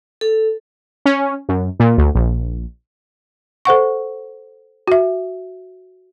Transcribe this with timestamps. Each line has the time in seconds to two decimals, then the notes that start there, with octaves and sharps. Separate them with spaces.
0.21 A4
1.06 C#4
1.49 F#2
1.80 A#2
1.98 D2
2.15 A#1
3.65 A4 C5 F#5 C#6
4.88 F#4 E5